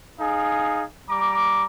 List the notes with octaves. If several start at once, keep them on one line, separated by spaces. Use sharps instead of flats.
D#4 G#4 F5 G#5
G3 A#5 D6